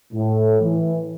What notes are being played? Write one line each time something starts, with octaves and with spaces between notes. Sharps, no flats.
A2
E3